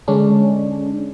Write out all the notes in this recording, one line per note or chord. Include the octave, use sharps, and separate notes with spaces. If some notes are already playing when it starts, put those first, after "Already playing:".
D3 G#3 C#4 D4